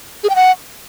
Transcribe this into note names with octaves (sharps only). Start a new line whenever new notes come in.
G#4
G5
F#5